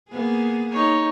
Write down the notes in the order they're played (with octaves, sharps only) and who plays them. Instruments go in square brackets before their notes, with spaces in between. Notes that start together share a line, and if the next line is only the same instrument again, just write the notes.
[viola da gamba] A#3 B3 G#4
[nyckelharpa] D#4 C#5